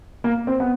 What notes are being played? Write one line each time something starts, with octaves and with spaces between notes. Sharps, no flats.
A#3
C4
B3